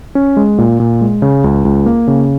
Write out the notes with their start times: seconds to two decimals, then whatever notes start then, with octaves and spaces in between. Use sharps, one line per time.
0.15 C#4
0.37 G#3
0.58 A#2
0.80 A#2
1.01 G#3
1.22 C#3
1.44 C#2
1.65 C#2
1.86 A#3
2.08 C#3